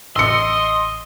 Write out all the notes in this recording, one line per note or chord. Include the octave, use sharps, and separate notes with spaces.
A1 D#5 C6 E6 C#7